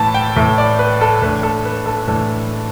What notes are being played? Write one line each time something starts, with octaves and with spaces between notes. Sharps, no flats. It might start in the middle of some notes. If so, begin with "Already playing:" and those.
Already playing: A2 E3 A3 A5 B5
G5
A2 E3 A3 E5
D5
B4
A4
A2 E3 A3 D4 B4
A4
B4
A4
A2 E3 A3 D4